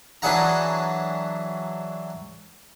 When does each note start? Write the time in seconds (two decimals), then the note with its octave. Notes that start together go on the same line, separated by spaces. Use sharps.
0.22 E3 F#3 D4 G#4 F#5 A#5